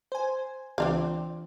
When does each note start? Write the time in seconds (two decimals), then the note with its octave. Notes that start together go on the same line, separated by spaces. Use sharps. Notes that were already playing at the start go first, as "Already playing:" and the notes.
0.12 C5 G#5
0.78 C#2 E3 C4 D4 F4 D5 F5